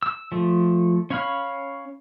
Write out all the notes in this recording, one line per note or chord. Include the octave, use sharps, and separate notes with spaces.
E6
F3 A3
C#4 C#5 F5 B5 F6